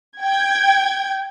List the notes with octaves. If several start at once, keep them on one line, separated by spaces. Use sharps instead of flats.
G5 G#6